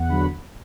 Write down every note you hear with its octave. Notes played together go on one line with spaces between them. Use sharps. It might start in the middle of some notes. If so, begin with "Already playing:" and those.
Already playing: E2 F#5
D3 F#3 B5